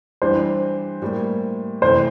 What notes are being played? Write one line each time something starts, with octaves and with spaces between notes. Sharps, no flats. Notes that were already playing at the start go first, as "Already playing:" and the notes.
E3 G3 D4 C5
A2 G3 A#3
C3 E3 A3 C5